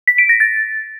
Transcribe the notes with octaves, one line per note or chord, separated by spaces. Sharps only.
B6
D7
A#6
A6